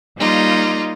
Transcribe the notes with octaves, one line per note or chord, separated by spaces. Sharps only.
G3 A#3 D#4 F4